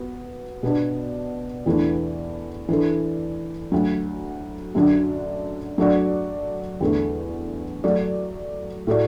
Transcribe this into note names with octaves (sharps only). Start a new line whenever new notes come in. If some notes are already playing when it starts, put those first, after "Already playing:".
Already playing: B3 F#4
B2 B3 D4
E2 E3 A3 D4
E3 D4 A4
D2 D3 F#3
F#2 D3 F#3 D4 F#4
F#3 A3 D4 F#4 D5
E2 D3 A3
F#3 A3 F#4 D5
A2 A3 F#4 D5